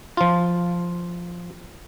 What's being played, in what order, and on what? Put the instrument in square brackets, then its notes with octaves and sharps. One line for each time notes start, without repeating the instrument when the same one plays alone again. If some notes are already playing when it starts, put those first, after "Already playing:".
[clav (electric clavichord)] F3 F4